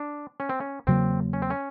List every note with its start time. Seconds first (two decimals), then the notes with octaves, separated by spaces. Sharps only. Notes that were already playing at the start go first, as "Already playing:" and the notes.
Already playing: D4
0.40 C#4
0.49 C4
0.60 C#4
0.87 E2 C#3 F#3 A#3 C4
1.33 C#4
1.42 C4
1.50 C#4